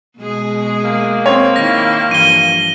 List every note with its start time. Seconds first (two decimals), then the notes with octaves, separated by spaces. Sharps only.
0.18 B2 G#3 G#4
0.84 A#3
1.26 C4 C#5
1.56 D#3 E4 A#6
2.11 G2 E3 F3 D#7 G7